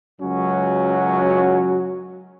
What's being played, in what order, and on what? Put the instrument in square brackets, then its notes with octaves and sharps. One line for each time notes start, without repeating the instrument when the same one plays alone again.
[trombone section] C#2 F#2 F#3 C#4 F#4